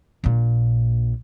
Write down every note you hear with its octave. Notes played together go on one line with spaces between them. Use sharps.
A#1 A#2